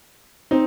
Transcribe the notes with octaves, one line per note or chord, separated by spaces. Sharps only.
C4 D#4